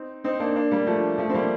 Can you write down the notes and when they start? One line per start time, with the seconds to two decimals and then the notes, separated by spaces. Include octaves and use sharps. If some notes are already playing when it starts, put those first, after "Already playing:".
Already playing: C4 D#4
0.24 C4 D#4
0.40 A#3 D4
0.56 A#3 D4
0.71 G3 A#3
0.87 F3 A3
1.18 F3 A3
1.29 C4
1.34 G3 A#3